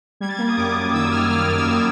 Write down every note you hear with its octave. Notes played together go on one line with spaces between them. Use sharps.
G3 G#6
A6
A#3 G#6
D#6
F#2 D6
D#6
F#2 D#6
D#3 E6
E6
D#3 F6
A#3 F6
F#2 F6
E6
F#2